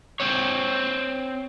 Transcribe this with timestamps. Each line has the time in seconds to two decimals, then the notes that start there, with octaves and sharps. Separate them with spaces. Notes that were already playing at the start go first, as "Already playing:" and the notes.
0.20 C4 C#5